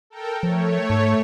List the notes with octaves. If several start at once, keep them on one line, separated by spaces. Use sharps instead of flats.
A4 A#4 G5
F3 A3 C#5
G#2